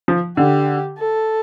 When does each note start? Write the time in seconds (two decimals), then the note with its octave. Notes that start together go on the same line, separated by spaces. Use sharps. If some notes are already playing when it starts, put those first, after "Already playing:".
0.08 F3
0.37 D3 G4
0.98 A4